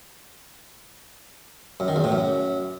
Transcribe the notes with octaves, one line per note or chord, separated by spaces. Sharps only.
F#2
D#3
E2
A2
F#2